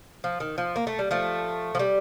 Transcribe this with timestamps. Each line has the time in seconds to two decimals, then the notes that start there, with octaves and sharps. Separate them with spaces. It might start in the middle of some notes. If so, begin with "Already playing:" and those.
0.24 F3
0.40 D#3
0.58 F3
0.76 A#3
0.87 A3
0.99 G3
1.11 F3 A3
1.75 F3
1.79 G3